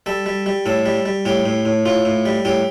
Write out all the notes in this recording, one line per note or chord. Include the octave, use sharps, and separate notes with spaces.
G3 A4
G3
G3
A2 A4
G3
G3
A2 G4
A2
A2
A2 F4
A2
G3
A2 G4